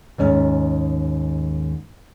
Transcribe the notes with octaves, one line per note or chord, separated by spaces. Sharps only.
D#2 G#2 C#4